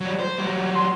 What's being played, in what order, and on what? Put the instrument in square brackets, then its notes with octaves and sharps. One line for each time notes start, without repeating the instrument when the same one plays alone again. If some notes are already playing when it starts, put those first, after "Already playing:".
[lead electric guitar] F#3 G3
C5
F#3 G3
[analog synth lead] C6